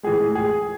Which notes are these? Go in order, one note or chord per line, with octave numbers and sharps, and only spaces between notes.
A2 E3 G#3 G#4
G#4